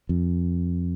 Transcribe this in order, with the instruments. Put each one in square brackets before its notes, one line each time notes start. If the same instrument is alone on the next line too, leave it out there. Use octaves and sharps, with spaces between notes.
[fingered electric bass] F2